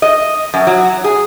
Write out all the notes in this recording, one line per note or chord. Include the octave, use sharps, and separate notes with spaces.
D#5
F#2
F#3
G#4